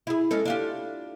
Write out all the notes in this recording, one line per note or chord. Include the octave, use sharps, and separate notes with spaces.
E4 G#4
G#3 C#4 A4
D4 F4 G4